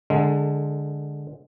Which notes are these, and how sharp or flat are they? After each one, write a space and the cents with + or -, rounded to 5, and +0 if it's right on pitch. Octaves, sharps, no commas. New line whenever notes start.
D3 +0 G#3 +0 A4 +30